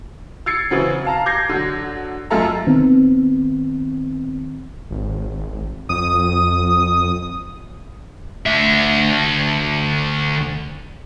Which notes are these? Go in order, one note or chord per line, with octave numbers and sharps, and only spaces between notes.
E6 G#6 A6 C7 C#7
C#3 E3 F#3 C4
F5 A5 A#5
D6 G6 G#6 A#6 C7
D3 F#3
F#2 G#3 F4 A4 E5 A#5
D#3 B3 C4
G#1
F2 D#6
D2 E5